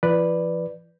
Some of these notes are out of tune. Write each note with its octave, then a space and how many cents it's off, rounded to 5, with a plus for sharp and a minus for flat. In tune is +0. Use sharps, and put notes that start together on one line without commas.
E3 +45 B4 +0 D5 +0